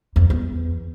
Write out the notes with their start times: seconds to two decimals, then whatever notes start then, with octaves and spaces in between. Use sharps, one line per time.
0.16 F2
0.30 E2